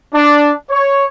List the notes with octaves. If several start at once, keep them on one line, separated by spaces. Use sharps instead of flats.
D4
C#5